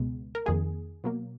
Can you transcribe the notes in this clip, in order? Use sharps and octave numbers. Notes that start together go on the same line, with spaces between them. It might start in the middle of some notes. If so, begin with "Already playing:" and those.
Already playing: C#2 B2 G#3 B3
A#4
F2 D#3 A#3 G#4
B2 F#3 A#3